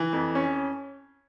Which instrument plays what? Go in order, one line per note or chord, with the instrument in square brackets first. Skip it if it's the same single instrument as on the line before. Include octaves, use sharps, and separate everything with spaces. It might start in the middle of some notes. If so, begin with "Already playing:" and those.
Already playing: [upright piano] E3
F2
C#4